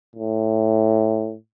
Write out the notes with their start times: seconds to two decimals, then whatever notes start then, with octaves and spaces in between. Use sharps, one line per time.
0.16 A2